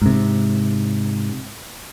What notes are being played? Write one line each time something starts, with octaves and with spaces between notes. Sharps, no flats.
G#2 C3